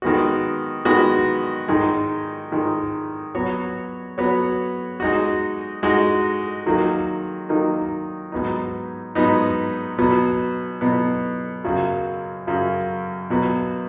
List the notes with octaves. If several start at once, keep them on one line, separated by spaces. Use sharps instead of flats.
D#3 G#3 B3 F#4
D#3 G#3 B3 F#4
G#2 D#3 G#3
G#2 D#3 G#3
F#3 B3 F#4 C#5
F#3 B3 F#4 C#5
G#3 D#4 F#4
G#3 D#4 F#4
D#3 F#3 A#3 D#4
D#3 F#3 A#3 D#4
G#2 F#3 B3 D#4
G#2 F#3 B3 D#4
B2 F#3 B3
B2 F#3 B3
F#2 C#3 F#3
F#2 C#3 F#3
B2 F#3 B3